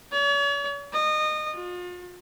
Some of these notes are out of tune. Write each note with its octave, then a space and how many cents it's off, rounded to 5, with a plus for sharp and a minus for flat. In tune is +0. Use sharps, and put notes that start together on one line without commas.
C#5 +45
D#5 -25
F4 +40